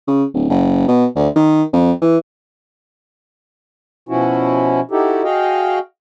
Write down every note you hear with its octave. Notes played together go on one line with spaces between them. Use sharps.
C#3
D1
F#1
B2
D2
D#3
F2
E3
B2 F3 C#4 E4 F#4
D#4 E4 F#4 G4 A4
F#4 G#4 D#5 F5 G5